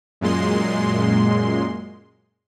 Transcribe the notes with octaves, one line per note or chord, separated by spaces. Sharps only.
F#2 A#2 G#3 C6